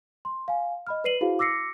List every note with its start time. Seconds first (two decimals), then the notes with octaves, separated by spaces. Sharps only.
0.25 C6
0.48 F5 G#5
0.87 D#5 B5 F6
1.04 B4 D5 C7 D#7 F#7
1.21 E4 F#4 G#4 C5 F5
1.39 D6 E6 A#6 C7 C#7